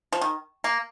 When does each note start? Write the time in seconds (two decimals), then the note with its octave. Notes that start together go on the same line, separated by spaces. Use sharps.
0.13 F3
0.21 D#3
0.64 A#3